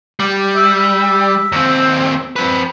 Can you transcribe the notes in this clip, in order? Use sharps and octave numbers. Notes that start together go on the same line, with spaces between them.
G3
E5
D#2 C4
C4 B4